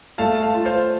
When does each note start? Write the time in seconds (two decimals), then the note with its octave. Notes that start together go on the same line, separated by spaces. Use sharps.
0.18 A3 F5 A5
0.42 F5 A5
0.54 F4
0.65 C5 F5